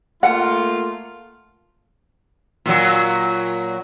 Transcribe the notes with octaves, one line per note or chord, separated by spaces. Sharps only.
A3 A#3 F4 F#5
A#2 F#3